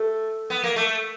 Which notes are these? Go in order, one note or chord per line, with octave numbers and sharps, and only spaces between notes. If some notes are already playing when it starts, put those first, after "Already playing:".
Already playing: A3
B3
A#3
A3